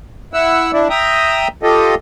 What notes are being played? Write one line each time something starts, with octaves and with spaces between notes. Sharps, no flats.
E4 F#5 E6
D4 E4
E5 G5 A#5 D#6
F4 G4 A4 D#5